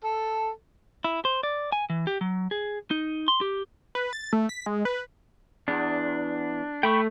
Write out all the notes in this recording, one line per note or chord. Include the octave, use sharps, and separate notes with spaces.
A4
E4
C5
D5
G#5
E3
G4
F#3
G#4
D#4
C6
G4
B4
A6
A3
B6
G#3
B4
E2 D4
A3 G5 B5 C#6